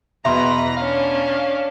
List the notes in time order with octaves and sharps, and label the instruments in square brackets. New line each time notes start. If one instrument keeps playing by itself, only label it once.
[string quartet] E2 B4 A#6 [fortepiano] B2 [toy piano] E5 C6 [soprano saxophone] A#5
[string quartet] C#4 D4 [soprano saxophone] F5